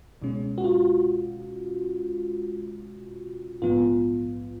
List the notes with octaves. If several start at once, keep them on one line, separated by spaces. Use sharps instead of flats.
C#2 B2 G#3 C#4
F#4
F4
A#1 G#2 F3 B3 F4